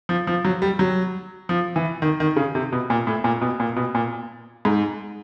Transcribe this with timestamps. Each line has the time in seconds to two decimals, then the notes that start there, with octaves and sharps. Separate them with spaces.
0.09 F3
0.27 F3
0.45 F#3
0.62 G3
0.79 F#3
1.49 F3
1.76 E3
2.02 D#3
2.20 D#3
2.36 C#3
2.55 C3
2.72 B2
2.90 A#2
3.07 A2
3.24 A#2
3.41 B2
3.60 A#2
3.76 B2
3.95 A#2
4.65 G#2